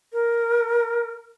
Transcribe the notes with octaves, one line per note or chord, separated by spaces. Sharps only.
A#4